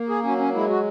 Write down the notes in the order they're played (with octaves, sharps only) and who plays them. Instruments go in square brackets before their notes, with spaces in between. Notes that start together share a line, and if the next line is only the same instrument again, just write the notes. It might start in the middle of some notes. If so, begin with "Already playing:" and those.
Already playing: [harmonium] A#3
G#4
F#3 C#4
C#4
G#3 E4
F#4